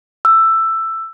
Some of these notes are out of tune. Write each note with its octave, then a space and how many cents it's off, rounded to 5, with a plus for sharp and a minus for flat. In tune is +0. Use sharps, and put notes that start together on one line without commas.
E6 +10